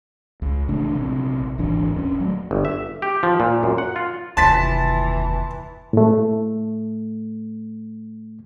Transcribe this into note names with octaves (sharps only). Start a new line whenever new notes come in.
C#2
A1 C#3 A3 D4
A#1 C3
D1 G#1 E3 D4
D#1 C#4
F#3 A3
G1
E5
G4
F3
A#2
F#2
F#5
F4
F1 D#2 E3 A5 C6 A6 B6
A2 A3